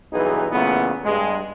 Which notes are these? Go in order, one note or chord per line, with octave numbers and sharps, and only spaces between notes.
B1 G2 E3 D#4 G#4 B4
A#2 C#3 E3 A3 B3
G2 G#3